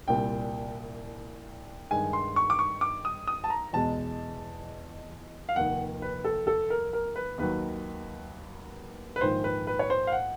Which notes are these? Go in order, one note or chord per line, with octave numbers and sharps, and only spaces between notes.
C2 A#2 G3 C4 G5
G2 D#3 G#3 G#5
C6
C#6
D6
C#6
D6
D#6
D#6
A5
A#5
E2 B2 G#3 A5
F5
F1 D#2 D#3 F#5
B4
A4
A4
A#4
A#4
B4
D#2 D#3 F#3 B4
B4
A#1 G#2 D#3 C5
B4
B4
C#5
C5
F5
F#5